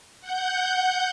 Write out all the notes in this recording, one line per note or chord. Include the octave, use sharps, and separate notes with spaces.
F#5 G6